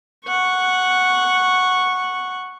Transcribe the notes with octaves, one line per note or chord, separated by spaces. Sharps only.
F#5 C#6